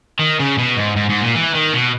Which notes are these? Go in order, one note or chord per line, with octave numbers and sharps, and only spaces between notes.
D#3
C#3
B2
G#2
G#2
G#2
A#2
E3
D#3
B2